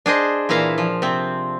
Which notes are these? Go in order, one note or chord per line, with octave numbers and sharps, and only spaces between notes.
D4 G#4 C5 D#5
A#2 E3 E4 F5 A#5
F3
C3 C4